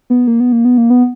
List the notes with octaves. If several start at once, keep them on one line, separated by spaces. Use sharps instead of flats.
B3
A#3
B3
A#3
B3
A#3
B3